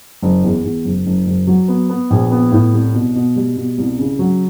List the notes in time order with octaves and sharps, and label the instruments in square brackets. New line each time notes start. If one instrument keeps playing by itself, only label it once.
[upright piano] F#1
E2
E2
F#1
F#1
F#1
F#3
B3
B3
A#1
B3
A2
C2
B2
B2
G3
B2
C2
C#3
F#3